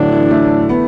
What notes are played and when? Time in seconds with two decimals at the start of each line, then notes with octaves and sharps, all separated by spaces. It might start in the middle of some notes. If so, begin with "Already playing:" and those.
Already playing: A2 D3 E3 F#3 D4
0.12 E3
0.30 A3
0.69 B3